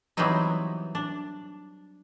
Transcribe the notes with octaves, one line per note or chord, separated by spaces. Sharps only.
E3 F#3 G3 B3 C4 D#4
D4